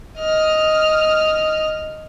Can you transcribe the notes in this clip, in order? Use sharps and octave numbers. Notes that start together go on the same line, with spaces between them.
D#5 F6